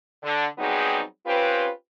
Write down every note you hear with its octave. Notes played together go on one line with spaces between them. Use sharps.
D3
F#3 G3 B3 C4 D#4 G#4
C4 C#4 F4 G4 B4